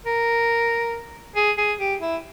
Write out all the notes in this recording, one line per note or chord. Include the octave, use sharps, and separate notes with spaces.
A#4
G#4
G#4
G4
E4